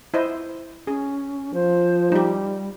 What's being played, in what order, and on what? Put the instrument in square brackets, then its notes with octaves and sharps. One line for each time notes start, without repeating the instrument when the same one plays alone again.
[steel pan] E4 C5 D#5
[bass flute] C#4 [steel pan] G#4
[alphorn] F3 [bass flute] C5
[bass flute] G3 [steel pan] D#4 G4